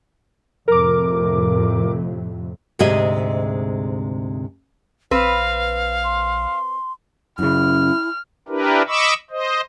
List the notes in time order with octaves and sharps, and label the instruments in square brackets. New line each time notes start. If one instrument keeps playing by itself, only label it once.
[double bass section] F2 A2 C3 [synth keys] A#4 D6
[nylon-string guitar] D2 G#2 C3 G#3 G#4 D#5
[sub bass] A#1 [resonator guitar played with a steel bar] C4 B4 [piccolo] F5
[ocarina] C6
[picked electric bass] F#2 C#3 [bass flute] E4 [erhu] F6
[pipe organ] D4 E4 G4 A#4 B4
D#5 B5 C#6 D6 E6
C5 D#5